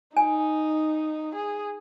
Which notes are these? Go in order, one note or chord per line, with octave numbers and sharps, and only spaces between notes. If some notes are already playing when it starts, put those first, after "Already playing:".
D#4 G#5
G#4